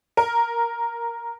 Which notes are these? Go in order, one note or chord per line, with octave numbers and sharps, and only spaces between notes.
A#4